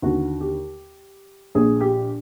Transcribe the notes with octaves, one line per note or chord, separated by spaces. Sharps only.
D#2 D3 F#4
G4
A#1 A#2 G#4
G4